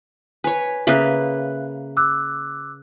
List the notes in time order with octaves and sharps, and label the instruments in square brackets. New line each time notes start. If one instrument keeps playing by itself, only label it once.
[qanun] B4 C#5 [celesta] G#5
[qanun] C#3 A#3 B4 [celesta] E5 F#6
[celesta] D6 E6 F#6